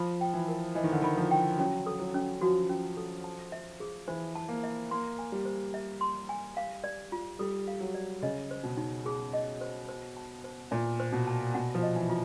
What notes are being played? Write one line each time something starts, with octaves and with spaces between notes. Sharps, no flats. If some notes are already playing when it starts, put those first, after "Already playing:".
Already playing: F3 B5
G5
E3
A#4
E3 D#5
D#3
D3
D#3 B5
F3
G5
F#3 C#4
A4
F#3
C#4
F3 F#4
C#4
A4
A5
E5
G#4
E3 C5
A5
A#3
E5
A#3 C6
G#5
G3
C5
E5
C6
G#5
F5
D5
F4
G3 A4
F5
F#3
D5
C#3 D#5
C5
B2
D#4
G#4
D#5
C5
C5
A5
C5
A#2 E5
C5
B2
A5
B2 F#5
F3
D#5
E3
F4